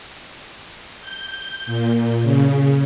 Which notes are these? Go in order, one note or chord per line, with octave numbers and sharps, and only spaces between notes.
G6
A#2
C#3